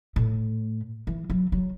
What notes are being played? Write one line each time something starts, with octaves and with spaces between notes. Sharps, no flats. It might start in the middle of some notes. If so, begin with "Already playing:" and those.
A2
E3
F#3
F#3